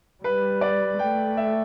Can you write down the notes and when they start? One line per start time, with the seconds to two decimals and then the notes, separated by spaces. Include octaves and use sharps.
0.23 G3 B4
0.61 D5
0.99 A3 G5
1.37 E5